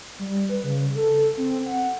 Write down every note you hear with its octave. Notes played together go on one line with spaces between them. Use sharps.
G3
B4
C#3
A4
C4
F#5